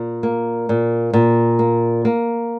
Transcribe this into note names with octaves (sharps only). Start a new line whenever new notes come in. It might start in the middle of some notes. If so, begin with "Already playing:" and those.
Already playing: A#2
A#3
A#2
A#2
A#3
A#3